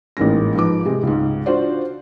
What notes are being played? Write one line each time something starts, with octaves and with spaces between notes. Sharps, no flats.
A1 G#2 G#3 A#3 C#4 A#6
G#2 F3 B4 D6
C3 G#3
C#2 G#2
D4 F4 F#4 C5 D5